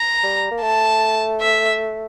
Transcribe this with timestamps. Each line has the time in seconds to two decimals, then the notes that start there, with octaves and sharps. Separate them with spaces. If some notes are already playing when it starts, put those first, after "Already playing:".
Already playing: A#5
0.23 G3
0.51 A#3
0.62 A3 A5
1.41 E5